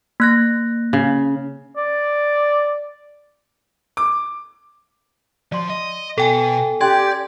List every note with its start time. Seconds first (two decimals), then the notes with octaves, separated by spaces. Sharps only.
0.20 A#3 F#6 A#6
0.93 C#3
1.77 D5
3.97 D6
5.52 F3 D5 C6
5.70 D#5
6.18 B2 A4 G5 G#5
6.81 C#4 G4 D5 G5 C6 G#6